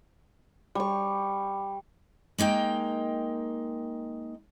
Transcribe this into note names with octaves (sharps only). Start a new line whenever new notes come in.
G3 C#6
G#3 A#3 D#4 G5